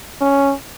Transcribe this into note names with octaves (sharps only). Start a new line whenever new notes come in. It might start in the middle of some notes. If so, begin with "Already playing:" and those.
C#4